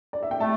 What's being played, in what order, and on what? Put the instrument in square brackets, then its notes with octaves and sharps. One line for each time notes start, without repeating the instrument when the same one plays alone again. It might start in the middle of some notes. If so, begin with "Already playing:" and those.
[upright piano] D5
E5
G5
[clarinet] A3 [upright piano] E5 A5